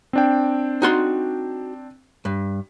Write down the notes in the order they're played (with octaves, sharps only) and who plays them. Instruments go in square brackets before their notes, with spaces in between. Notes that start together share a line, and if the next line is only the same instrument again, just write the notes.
[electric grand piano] C4 D4 G5
[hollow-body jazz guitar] D#4 F#4 C6
G2